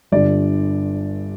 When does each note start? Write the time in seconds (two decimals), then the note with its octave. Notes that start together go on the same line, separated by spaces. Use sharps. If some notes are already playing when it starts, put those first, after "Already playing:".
0.12 G1 G2 D3 D5